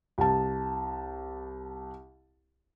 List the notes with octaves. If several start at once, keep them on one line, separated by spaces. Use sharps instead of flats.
C2 A5